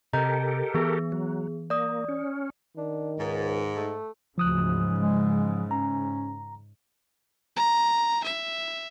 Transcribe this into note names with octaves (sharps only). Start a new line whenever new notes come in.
C3 G4 A4 A#4 D#5 A#5 G6
E3 B3 G#4
F#3
A#3 D5 D#6
C#4
D#3 D4
C#2 G#2
A3
D2 G#2 C#3 F3 D#6 F#6
G#3
C#4 A#5
A#5
E5